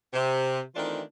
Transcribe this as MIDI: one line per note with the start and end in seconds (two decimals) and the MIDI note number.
0.13 0.60 48
0.75 1.01 51
0.75 1.01 52
0.75 1.01 57
0.75 1.01 60
0.75 1.01 62
0.75 1.01 65